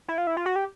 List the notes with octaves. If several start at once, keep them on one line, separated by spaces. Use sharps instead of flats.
E4
F4
E4
F4
F#4
G4